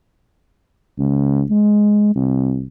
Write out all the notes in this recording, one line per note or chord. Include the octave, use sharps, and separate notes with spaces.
C#2
G#3
C2